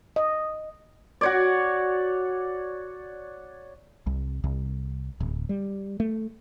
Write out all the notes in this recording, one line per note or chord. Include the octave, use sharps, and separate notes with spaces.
D#5
F#4 C#5 D5
C2
C2
D1
G3
A3